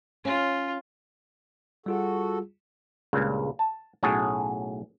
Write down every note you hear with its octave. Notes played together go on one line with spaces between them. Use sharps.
C#4 F4
G3 F4 F#4 G#4 A4
C#2 G2 A#2 C#3
A5
B1 A2 C#4 F#4 G#4 A5